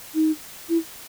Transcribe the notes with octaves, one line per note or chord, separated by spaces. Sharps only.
D#4
E4